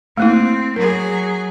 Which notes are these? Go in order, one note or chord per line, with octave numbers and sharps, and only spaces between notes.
A3 A#3 C4 E4
F#3 G#4 A#4